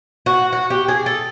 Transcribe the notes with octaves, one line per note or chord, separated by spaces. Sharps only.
F#4
F#4
G4
G#4
A4